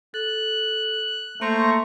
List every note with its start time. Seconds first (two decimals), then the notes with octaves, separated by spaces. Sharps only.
0.14 A4 F#6
1.41 A3 A#3 C5 A#5 C6 C#6